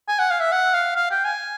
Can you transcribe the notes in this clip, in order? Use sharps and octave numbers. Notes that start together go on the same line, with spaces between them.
G#5
F#5
F5
E5
F#5
F5
F5
G5
G#5